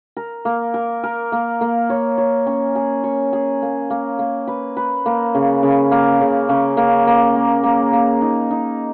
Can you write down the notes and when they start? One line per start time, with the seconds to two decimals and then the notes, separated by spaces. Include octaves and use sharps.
0.17 A#4
0.45 A#3
0.74 A#4
1.04 A#4
1.32 A#3
1.61 A#3
1.90 C#5
2.18 C#5
2.47 C#4
2.75 G#4
3.04 C#5
3.33 G#4
3.62 A#3
3.90 A#3
4.19 A#3
4.48 B4
4.77 B4
5.06 A#3
5.35 C#3
5.63 C#3
5.91 A#3
6.21 C#3
6.49 C#3
6.77 A#3
7.07 A#3
7.35 A#3
7.64 A#3
7.93 A#3
8.22 D#4
8.51 D#4